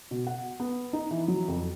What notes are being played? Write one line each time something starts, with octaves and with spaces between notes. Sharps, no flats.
B2
F#5
B3
D#4
E3
F#3
F2